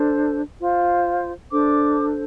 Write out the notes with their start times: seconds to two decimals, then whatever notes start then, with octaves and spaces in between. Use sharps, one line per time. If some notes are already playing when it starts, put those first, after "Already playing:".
Already playing: D4 A4 C5
0.60 F4 C5
1.51 D4 A4 C5 D6